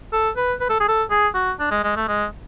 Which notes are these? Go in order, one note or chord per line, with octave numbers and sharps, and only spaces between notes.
A4
B4
B4
A4
G#4
A4
G#4
F#4
D4
G#3
G#3
A3
G#3